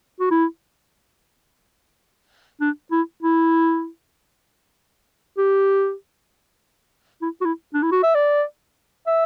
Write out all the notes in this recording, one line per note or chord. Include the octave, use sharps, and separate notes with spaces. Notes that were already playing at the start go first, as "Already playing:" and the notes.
F#4
E4
D4
E4
E4
G4
E4
F#4
E4
D4
E4
F#4
E5
D5
E5